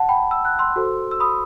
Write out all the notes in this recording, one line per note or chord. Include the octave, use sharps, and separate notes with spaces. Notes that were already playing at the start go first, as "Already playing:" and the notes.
Already playing: F#5 A5
G5 B5
E6
F#6
C6 E6
F#4 A4 C5
E6
B5 D#6